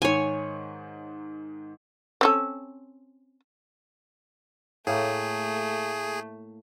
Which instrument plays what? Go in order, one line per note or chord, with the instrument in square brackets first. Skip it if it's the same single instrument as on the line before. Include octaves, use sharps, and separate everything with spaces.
[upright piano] G#2 D#3 [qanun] C#5 G#5
[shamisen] C4 C#4 A4
[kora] A2 A#3 [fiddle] A3 [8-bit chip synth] G#4